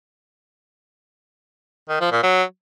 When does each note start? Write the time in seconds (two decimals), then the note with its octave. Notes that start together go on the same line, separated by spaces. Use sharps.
1.89 D#3
2.00 F3
2.12 A#2
2.23 F#3